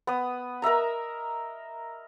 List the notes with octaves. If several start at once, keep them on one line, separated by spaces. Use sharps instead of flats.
B3 D#6
A#4 D#5 E5 A#5